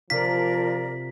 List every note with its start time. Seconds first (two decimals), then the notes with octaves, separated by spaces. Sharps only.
0.10 C3 F3 F4 A#4 D5 B6